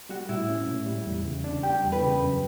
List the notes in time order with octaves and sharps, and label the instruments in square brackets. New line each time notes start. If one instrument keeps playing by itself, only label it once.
[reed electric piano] G3 [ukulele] F#4
[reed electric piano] A2 [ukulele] E4
[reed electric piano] C#4
A2
G3
E2
C#3
D4
[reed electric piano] G3 [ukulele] G4
[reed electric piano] E2
[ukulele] B4
[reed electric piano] C#3
F#2